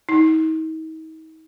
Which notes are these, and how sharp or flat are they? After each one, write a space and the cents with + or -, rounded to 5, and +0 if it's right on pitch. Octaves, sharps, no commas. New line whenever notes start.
D#4 +40